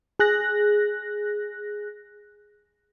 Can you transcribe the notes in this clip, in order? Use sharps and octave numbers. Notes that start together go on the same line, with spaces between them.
G#4 F#6 A#6